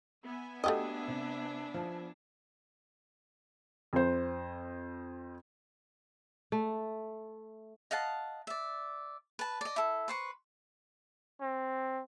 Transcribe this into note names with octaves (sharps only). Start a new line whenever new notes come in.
B3 E5 G#5
A3 D4 F#4 G4 D#5 G5 D#6
C3
F3
F2 C5
A3
D#5 F5 F#5 A5
D5 E5
B4 A5
D5 D#5
E4 A4
B4 C5 C#6
C4